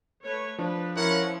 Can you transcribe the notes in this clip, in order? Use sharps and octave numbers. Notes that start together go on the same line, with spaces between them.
A3 B4 C#5
F3 D4 B4
F3 C#4 E4 A#4 C#5 F#5 B5